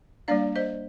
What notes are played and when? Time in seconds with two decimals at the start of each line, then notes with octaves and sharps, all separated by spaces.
0.28 G3 A#3 D4 D5 F5
0.56 C5 D#5